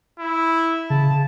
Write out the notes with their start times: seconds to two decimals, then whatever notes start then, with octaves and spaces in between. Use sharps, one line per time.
0.19 E4
0.90 C#3 A5